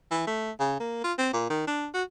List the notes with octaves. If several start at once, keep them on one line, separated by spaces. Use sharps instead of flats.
E3
A3
C#3
A#3
F4
C4
A#2
D#3
D4
F#4